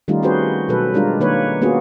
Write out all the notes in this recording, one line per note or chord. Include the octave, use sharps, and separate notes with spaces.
D#3 G3 A3 C#4 D#4 F4
C4 C#4 F#4 G#4 B4 C5
B2 F#3 A4 B4
G3 G#3 D4 F4 A#4
D#3 A#3 B4 C#5
A#3 B3 C#4 F4 F#4 G#4